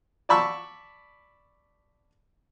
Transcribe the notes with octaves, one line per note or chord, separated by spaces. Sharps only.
D5 A5 B5 C#6 E6